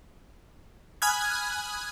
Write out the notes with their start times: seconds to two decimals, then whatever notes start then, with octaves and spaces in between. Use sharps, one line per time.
1.02 G#5 B5 D#6 F6 F#6 G#6